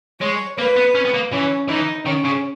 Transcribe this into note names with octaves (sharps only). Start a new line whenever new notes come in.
G#3 C#5
A#3 B4
B3
C#4
B3
A#3
E3 C#4
E3 D#4
D#3 C#4
C#3